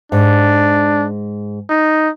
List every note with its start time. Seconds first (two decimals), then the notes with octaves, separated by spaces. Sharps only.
0.12 G#2 D4
1.69 D#4